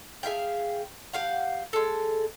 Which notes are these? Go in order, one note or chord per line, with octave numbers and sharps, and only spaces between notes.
G#4 E5 F5 G5
G4 F5 F#5
G#3 A4